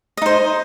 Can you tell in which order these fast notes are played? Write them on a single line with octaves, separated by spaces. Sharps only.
D#5 D#4 C5